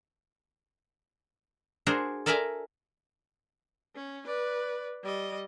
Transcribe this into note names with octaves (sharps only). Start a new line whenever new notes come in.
D4 F#4 G#4 A#4 C5
A4 A#4 D5 E5 G#5 A#5
C#4
B4 D5
G3 D#5